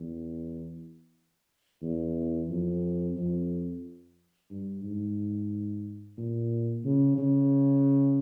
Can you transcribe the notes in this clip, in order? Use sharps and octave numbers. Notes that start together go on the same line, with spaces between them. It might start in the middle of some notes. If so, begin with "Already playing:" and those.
Already playing: E2
E2
F2
F2
G2
G#2
A#2
C#3
C#3